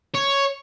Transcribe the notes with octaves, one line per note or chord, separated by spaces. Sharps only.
C#5